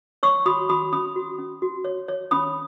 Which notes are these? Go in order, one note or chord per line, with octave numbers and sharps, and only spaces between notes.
C#5 C#6 E6
F#4 B5 D#6
F#4 B5 D#6
C#4 B5 D#6
F#4
C#4
F#4
C#5
C#5
C#4 B5 D#6